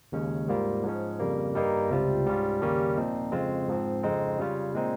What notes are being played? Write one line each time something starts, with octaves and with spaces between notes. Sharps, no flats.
D#2 C#3 G#3 C#4
G#2 G3 A#3 F4
G#2 F3 G#3 C#4
F2 C#3 G3 A#3
G2 G3 A#3 D#4
C#2 C3 G3 C4 F4
G#2 G3 C#4 F4
D#2 C#3 G3 A#3 C#4
A#2 F3 C4 D#4
F2 C#3 G#3 C4 F4
G#2 F3 C4
F2 C#3 G#3 C4 D#4
C#3 G3 C#4 F4
A#2 G#3 C4 D#4